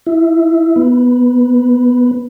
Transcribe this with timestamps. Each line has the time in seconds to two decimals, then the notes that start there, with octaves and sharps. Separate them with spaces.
0.07 E4
0.76 B3